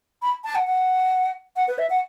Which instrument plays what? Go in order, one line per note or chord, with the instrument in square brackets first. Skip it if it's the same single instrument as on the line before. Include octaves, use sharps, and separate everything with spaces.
[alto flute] B5
A5
F#5
F#5
F#5
B4
E5
F#5